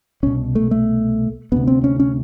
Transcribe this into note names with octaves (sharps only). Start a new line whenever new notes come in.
C2 B2 C#4
A3
A3
D2 C3 B3
C4
C#4
C#4